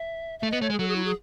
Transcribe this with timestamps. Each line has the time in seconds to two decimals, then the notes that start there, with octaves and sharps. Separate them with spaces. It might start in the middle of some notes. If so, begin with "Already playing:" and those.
Already playing: E5
0.39 A3 E5
0.50 B3 D#5
0.61 A3 C#5
0.70 G#3 G#4
0.79 F#3 A4
0.88 G#4
0.96 E4
1.05 G#4